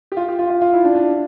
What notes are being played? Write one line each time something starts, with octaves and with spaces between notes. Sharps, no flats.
G4
F4
G4
F4
F4
F4
E4
D4
D4